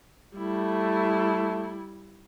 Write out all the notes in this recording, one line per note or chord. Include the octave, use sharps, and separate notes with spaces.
G3 A3 E4